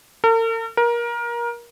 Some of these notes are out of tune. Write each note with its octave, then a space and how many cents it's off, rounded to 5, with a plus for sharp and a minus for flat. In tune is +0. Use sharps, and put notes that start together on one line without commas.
A#4 -45
A#4 +25